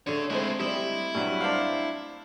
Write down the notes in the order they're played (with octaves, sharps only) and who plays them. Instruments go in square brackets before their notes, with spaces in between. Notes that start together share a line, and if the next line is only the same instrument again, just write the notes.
[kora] D3 A3 [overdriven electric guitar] G#4 C#5
[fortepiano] G#3 [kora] A3 C4 [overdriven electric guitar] D4 E4
[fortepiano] G3 [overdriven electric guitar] E4 [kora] D#5 E5
[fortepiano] G2 F#3
D4 C5 F5